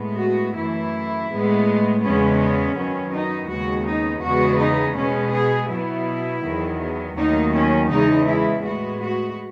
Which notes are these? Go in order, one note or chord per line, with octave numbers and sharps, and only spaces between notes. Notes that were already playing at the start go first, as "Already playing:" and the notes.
Already playing: A2 G#3 B3
F#4
F#2 E3 A3 E4
A2 G#3 B3
E2 C#3 G#3 B3 C#4
C#4
F#2 D#3 F#3 B3
D#4
D#2 C#3 G#3 B3 F#4
D#4
E2 C#3 G#3 B3 F#4
D#4
B2 G#3 B3 C#4
G#4
B2 F#3 B3 E4
E2 D#3 F#3 B3
D#2 D#3 F#3 A3 D#4
C#4
E2 C#3 G#3 B3 D#4
E4
A2 G#3 B3 F#4
F#4